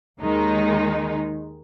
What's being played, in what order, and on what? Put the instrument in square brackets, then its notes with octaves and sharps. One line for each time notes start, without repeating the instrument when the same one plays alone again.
[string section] D#2 D#3 G#3 D#4